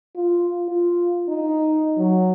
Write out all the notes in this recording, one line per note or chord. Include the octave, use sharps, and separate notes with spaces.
F4
F4
D#4
F#3